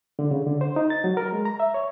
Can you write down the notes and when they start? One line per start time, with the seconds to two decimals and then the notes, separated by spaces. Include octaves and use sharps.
0.19 D3
0.31 C#3
0.47 D3
0.61 C5
0.76 D#4
0.90 A6
1.04 F#3
1.17 A#4
1.32 G#3
1.45 A#5
1.60 E5
1.74 C#5